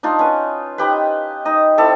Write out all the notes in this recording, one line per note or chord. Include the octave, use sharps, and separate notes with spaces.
D4 D#4 F4
C#4 B4
D#4 G4 B4
D#4 D#5
C4 E4 A4 D5